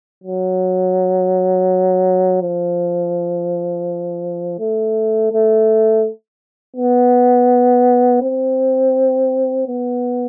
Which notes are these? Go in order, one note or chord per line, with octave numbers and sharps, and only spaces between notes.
F#3
F3
A3
A3
B3
C4
B3